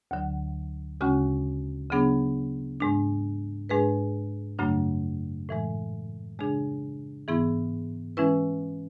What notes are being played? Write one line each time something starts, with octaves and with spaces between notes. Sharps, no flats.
D2 D3 F#3
D2 C#3 G#3 C#4 F#4
C#3 F#3 B3 D4 G#4
G#2 G#3 D4
G#2 G#3 D4 G#4 B4
F#2 C#3 F#3 A3 D4
A2 E3 G#3
C#3 G#3 D4 G#4
G#2 E3 B3 E4 G#4
E3 G#3 C#4 E4 B4